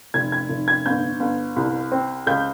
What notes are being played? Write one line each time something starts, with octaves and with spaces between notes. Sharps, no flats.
F1 G#6
G#6
F1
G#6
G1 G6
G1
C2
C4
C#2 G6